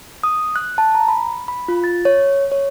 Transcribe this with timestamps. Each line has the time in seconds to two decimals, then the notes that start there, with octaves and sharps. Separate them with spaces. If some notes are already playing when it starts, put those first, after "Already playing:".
0.24 D#6
0.56 F#6
0.78 A5
0.95 A#5
1.08 B5
1.48 B5
1.68 F4
1.84 A6
2.05 C#5
2.51 C#5